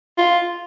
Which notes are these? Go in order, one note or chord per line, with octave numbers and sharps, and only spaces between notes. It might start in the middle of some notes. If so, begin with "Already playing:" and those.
F4